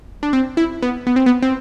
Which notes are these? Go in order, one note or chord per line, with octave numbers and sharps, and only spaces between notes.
D4
C4
E4
B3
B3
C4
B3
C4